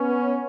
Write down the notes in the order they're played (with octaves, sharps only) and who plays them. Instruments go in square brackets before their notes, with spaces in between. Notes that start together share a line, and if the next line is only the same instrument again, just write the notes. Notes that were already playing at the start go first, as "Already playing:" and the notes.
Already playing: [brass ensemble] B3 C#4